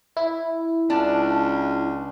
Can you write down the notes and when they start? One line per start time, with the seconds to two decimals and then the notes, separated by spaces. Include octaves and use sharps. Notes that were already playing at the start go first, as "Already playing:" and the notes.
0.17 E4
0.90 C#2 D4 A5